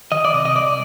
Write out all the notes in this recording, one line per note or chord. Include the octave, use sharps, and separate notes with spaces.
D#3 D#5
D5
C3 D#5
D#5
C2 D5